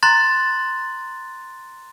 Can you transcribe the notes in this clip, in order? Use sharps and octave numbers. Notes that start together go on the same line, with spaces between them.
A#5 C6 F#6 A6